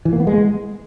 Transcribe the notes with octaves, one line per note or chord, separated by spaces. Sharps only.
E3
A#3
B3
G#3